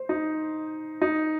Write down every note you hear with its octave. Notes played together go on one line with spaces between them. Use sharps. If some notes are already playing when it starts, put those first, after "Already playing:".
Already playing: C5
D#4
D#4